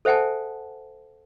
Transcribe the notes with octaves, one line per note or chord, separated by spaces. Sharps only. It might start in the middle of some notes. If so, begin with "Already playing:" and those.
A4 C5 E5 F#5 G#5 A5